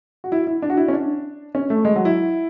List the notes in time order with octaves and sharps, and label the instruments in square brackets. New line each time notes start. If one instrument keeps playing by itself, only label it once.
[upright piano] F#4
E4
E4
D4
F#4
E4
C#4
D4
C#4
A3
G#3
F#3
E4